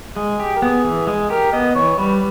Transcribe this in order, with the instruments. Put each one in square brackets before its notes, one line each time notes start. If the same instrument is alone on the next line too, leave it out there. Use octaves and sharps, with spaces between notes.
[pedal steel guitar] G#3 [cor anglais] G#4
[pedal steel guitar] G4
[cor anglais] A#4
[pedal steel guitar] B3 [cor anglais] G#4
[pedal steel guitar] E3
[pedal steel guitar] G#3 [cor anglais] G#4
[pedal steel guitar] G4 [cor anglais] A#4
[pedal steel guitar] B3 [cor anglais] D#5
[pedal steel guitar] E3 [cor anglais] C#5
[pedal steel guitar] G3 [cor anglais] B4